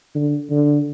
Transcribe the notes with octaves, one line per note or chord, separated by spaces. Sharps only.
D3
D3